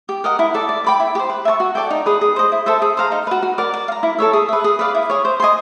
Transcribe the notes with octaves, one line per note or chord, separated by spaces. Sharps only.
G4
A#4 D#5 F#5
E4
A4 D5
D5
G5 B5 D6
E4
G4
C5
B4
E5 A5 C#6
F#4
A4 D5 G5
D#4
G#4 B4
G#4
C5 D#5
E4
A4 C5 E5
G#4
C5 F5 A#5
D#4
F#4 B4
F#4
A#4 D5
D5
F5
A#5
E4
A4 C#5 E5
G#4
B4 E5
G#4
B4 D5 F5
E4
G#4 C#5
C5
D#5 G#5 C6